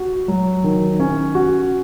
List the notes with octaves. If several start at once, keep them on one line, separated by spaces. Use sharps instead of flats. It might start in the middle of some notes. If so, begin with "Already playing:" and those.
Already playing: F#4
F#3
D#3
C#4
F#4